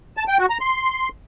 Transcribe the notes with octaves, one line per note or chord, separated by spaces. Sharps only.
A5
G5
F#4
A#5
C6